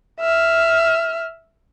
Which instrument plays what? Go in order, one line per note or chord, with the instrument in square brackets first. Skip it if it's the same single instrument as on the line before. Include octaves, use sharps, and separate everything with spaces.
[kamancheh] E5 F6